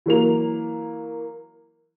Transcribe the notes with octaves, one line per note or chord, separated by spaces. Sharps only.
E3 F#3 A#3 F7